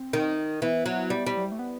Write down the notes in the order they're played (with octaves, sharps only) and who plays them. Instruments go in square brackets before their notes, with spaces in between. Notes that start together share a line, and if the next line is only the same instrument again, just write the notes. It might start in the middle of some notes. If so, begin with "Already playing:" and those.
Already playing: [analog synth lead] C4
[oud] D#3
[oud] E3 [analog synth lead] B3
[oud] F#3
G3
G3
[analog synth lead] F#3
G3
A3
B3